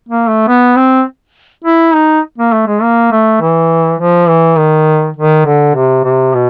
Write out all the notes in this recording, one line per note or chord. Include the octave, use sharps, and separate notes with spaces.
A#3
A3
B3
C4
E4
D#4
A#3
A3
G#3
A#3
A3
E3
F3
E3
D#3
D#3
D3
C3
C3
B2